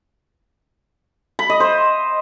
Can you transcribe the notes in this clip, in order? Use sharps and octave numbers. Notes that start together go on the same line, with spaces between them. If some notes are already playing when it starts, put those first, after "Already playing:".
B5
D#5
C5